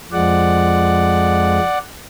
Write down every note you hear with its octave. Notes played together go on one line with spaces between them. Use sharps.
F2 F3 G#3 D5 F#5